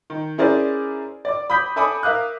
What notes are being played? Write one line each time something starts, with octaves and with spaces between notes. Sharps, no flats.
D#3
C#4 E4 G#4 A#4 C5 D5
D5 D6
B5 D#6 G6 B6
A4 E5 G#5 B5 D6 D#6
A#4 E5 F5 D#6 F#6